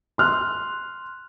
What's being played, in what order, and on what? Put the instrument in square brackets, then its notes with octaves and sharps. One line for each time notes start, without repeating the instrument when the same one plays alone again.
[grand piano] C6 F6 F#6